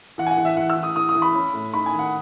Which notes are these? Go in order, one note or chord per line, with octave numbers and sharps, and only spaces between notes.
E3 F#5
G#5
F#5
E3
E5
E3 F#5
E6
E3
D#6
E3 D#6
D#6
E3
B5
C#4
A2
D#4 B5
G#5
D#3
F#5